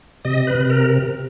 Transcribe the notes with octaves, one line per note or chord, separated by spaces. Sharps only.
C3 D#5
B4
C3
A#4